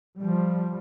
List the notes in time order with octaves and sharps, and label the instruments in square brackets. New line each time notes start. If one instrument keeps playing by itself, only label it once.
[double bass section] F3 G3